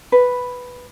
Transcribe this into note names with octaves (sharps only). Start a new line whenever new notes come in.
B4